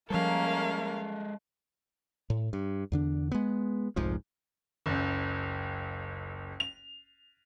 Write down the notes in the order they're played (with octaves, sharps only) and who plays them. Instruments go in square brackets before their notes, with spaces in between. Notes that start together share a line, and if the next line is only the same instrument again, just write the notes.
[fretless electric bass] F3 G3 [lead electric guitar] G#3 A4 [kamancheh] A#3 A#4 [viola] C#4 F5
[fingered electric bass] A2
G2
E2 D3 D4
G#3 B3
F1 C2 G#2 F3
[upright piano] F#1 C#2
F7